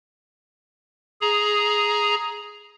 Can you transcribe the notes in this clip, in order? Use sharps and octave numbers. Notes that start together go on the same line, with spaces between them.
G#4 A#5